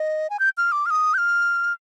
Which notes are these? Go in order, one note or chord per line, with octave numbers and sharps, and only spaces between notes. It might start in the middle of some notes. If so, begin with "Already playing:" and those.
Already playing: D#5
G#5
G6
F6
D6
F6
D#6
G6
F6